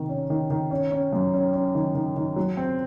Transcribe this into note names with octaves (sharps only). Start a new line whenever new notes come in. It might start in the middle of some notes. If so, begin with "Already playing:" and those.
Already playing: C3 D#3
C#4
D#3
D#3
C#4
C#4
F#2
C#4
C#4
D#3
D#3
D#3
F#3
C4